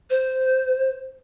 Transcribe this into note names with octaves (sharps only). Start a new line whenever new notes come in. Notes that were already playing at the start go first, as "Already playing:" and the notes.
C5